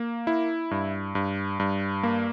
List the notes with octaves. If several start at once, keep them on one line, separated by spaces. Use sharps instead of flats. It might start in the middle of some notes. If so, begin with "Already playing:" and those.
Already playing: A#3
E4
G2
G2
G2
A#3